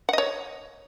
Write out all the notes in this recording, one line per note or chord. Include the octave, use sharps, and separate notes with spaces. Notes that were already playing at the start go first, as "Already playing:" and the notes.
C#5 D#5 F#5